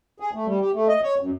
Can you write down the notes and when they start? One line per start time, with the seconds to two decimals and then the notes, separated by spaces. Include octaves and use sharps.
0.20 G#4
0.34 A3
0.47 G3
0.60 G4
0.74 A3
0.88 D#5
1.03 C#5
1.20 F#2